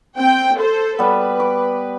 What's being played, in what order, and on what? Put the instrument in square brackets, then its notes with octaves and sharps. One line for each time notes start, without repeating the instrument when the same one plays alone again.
[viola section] C4 G5
A4 C5
[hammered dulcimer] G3 B3 [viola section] B4
[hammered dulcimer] D6